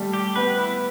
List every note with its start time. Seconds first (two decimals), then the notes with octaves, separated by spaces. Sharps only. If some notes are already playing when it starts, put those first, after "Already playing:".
Already playing: G3 A3
0.13 G4
0.36 B3 B4
0.58 E4